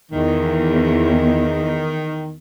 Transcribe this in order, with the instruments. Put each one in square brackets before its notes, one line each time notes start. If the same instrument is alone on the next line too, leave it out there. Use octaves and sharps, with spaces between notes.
[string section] E2 [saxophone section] D#3